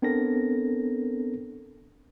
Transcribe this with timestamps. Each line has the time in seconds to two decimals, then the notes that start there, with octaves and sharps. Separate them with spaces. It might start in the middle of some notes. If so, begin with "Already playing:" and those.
0.02 B3 C4 D4 A4 A#4 A#6